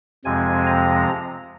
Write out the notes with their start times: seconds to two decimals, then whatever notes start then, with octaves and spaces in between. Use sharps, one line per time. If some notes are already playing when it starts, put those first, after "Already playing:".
0.25 F2 C3 F3 G#3 C4 G#5
0.66 A#5